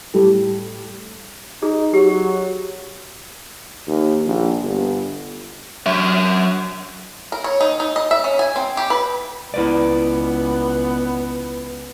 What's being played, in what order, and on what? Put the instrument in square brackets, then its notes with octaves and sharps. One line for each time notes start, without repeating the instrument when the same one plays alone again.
[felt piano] A2 G3 G4 A4
[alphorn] D#4 [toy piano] G#4
[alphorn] F#3 [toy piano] G4
[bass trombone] D#2
A#1
G1
[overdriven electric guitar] F#3 E5
[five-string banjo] A#4
C#5
D#4
D#4
D#5
E5
C#4
G#5
C4
G4
B4
[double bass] C#2 B3 [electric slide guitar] E4 B4 D5